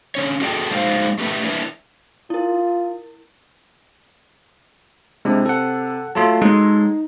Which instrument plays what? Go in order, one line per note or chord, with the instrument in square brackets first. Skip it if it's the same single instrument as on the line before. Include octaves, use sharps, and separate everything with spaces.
[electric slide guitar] D3 C#4 C#5
F#4 G#4 A4 D5 F#5 G5
F#3 G#3 D#4 G#4 C5 F5
A3 G4 B4 E5
D4 E4 B4 E5
[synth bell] E4 A#4 [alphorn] F4
[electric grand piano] C3 [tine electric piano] G#3 D4 E4
[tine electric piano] A4 F#5
[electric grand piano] F#3 A4 C6 [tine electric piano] A3 F4 A5
[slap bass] G#3 [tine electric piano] D#4